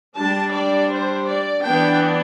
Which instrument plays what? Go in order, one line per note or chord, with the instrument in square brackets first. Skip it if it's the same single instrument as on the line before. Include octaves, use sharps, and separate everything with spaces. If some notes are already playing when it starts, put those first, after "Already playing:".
[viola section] G3 D4 A5
D5
C5
D5
E3 B3 D4 G5